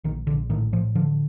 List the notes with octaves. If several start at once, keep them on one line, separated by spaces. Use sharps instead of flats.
A#1 D#3
A#1 D3
A2 D#3
A2 F3
D3 F3